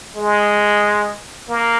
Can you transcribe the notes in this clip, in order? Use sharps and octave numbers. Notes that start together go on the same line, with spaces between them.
G#3
A#3